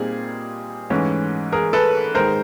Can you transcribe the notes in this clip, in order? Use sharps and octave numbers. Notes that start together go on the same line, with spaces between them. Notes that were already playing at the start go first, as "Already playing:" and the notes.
Already playing: A#2 G3 C4 D#4 G#4
G#2 E3 A3 C#4
G#4 A#4
A4 B4
G#2 D#3 G#3 A#4 C5